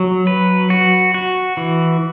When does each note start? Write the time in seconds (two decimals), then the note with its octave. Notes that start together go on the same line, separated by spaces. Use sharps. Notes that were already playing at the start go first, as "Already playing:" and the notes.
Already playing: F#3
0.27 B4
0.70 F#4
1.14 F#4
1.57 E3